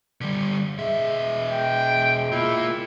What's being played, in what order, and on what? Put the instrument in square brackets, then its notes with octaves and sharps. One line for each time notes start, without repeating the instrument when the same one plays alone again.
[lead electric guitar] D3 G3
[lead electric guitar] B2 E5 [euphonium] G#3
[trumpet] G5
[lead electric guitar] A#3 F4 [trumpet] E4